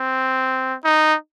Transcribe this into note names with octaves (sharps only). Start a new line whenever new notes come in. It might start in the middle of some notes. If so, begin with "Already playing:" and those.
Already playing: C4
D#4